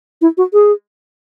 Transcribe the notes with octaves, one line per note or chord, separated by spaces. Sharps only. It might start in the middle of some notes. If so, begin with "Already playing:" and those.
E4
F#4
G#4